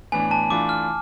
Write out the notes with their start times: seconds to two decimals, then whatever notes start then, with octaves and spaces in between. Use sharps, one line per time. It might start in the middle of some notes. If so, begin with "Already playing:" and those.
0.12 A2 E3 B3 D4 G#5
0.31 A5
0.50 E3 A3 D4 F4 D6
0.69 F6